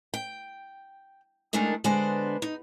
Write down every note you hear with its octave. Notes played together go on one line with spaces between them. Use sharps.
G5
D#3 G#3 A3 D4 D#4 A#4
D3 G#3 B3 D4 C5
D#4